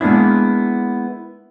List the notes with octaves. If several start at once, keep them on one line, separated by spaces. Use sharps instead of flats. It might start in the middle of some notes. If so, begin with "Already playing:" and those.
G#3 A#3 B3 D4 E4